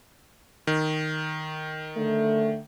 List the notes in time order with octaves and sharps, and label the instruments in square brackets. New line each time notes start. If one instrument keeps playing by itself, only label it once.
[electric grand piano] D#3
[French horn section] D3 A3